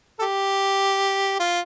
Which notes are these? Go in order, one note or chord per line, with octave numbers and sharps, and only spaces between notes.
A4
G4
F4